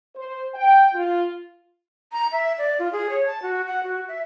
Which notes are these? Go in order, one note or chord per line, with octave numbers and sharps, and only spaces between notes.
C5
G5
F4
A#5
E5
D5
F4
G#4
C#5
A5
F#4
F#5
F#4
E5